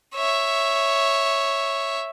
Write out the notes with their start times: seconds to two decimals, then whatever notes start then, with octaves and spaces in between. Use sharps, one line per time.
0.15 C#5 E5